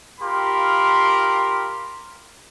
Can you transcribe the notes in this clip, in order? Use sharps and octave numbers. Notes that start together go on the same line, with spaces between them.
F4 G4 A#4 F5 B5 C6